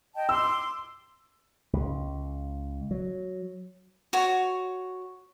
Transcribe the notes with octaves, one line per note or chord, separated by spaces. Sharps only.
D#5 G5 A5
C6 D6 E6
C#2
F#3
F#4 C#5